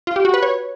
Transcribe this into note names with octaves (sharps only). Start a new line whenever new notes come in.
F4
G4
F#4
B4
C#5